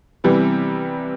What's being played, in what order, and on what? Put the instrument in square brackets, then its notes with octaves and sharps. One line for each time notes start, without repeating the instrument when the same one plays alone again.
[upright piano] C3 E3 G3 B3